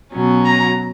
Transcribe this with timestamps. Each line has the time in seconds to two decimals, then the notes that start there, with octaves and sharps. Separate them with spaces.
0.14 B2 F#3 C#4
0.45 A#5